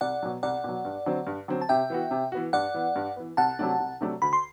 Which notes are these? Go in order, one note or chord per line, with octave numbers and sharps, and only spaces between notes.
C2 D5 F#5
B2 F#3
C2 D5 F#5
B2 F#3
G2
D3 F#3 C4
G2
D3 F#3 C4
A5
C3 E5 G5
E3 B3 F#4
C3
E3 B3 F#4
G2 D5 F#5
E3 B3
G2
E3 B3
C2 F#5 A5
C3 F#3 A3 D4
C2
C3 F#3 A3 D4
D2 B5
C6